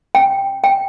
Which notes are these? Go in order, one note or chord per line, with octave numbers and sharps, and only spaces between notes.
G5
G5